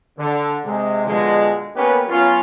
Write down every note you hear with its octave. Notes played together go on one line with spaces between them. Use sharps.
D3
C3 G#3
B2 D3 F3 G#3
A#3 B3 C#4 G4 A#4 B4
F#3 B3 C#4 F4